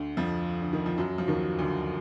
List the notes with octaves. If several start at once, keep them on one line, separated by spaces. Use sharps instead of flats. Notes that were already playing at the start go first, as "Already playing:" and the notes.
Already playing: D2 D3
F2 F3
D3
D#3
F3
F#2 F#3
F3
D#2 D#3
D2 D3